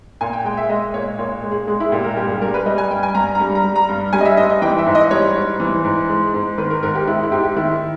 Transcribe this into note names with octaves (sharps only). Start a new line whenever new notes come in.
A#2 G#5
G5
G#3 G5
E5
G#3 D#5
A#2 C#5
A#2 C#5
G#3
G#4
G#3 G#4
E4
A#2 G4
A#4
G2 G4
G#4
G3 A#4
B4
G3 D#5
G#5
G2 G5
G#5
G2 A#5
G3 A#5
A#5
G3
A#5
G2
G3 G#5
D#5
E5
G#2 D#5
D#5
E3 G5
E5
G#2
D#5
G3 C#5
G#2
E3
G#2
G#3
G#2
D#3 B4
A#4
G#2 A#4
G4
G#3 E4
E4
G#2 G4
G4
D#3 E4